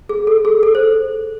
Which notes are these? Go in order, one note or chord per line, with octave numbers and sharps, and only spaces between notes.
G#4
A4
G#4
A4
C5